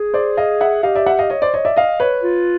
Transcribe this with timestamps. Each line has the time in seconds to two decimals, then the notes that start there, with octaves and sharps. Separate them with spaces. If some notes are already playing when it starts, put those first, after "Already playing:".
Already playing: G#4
0.14 C5 D5
0.37 D#5 F5
0.61 E5 F#5
0.83 G4 D#5 F5
0.95 D5 E5
1.06 E5 F#5
1.19 D#5 F5
1.30 C#5 D#5
1.42 C5 D5
1.54 C#5 D#5
1.65 D5 E5
1.77 D#5 F5
2.00 B4 C#5
2.23 F4